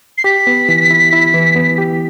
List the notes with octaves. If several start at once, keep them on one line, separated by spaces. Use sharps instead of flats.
C7
G4 B6
B3
E3
E4
E4
E3
B3
G4